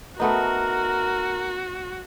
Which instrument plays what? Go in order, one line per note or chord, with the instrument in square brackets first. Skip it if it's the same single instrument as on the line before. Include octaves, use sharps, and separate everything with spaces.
[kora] A3 B3 D#4 [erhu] F#4 [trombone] A#4